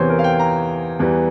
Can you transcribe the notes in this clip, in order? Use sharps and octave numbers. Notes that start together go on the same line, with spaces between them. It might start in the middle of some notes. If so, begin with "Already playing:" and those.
Already playing: E2 C3 E3 C5 C#5
A#4
F5
G5
A#5
E2 E3 G3